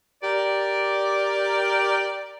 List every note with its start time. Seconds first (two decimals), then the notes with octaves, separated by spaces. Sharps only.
0.23 G4 A#4 D5